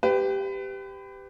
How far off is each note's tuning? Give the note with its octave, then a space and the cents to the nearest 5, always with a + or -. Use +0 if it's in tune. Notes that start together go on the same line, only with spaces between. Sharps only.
G4 +0 B4 +30